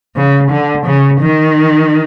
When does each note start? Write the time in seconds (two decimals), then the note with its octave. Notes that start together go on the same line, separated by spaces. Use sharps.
0.16 C#3
0.51 D3
0.86 C#3
1.20 D#3